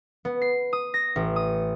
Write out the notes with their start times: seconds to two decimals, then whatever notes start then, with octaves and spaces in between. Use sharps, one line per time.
0.25 B3
0.42 C7
0.73 D#6
0.94 A#6
1.16 A1
1.36 D#6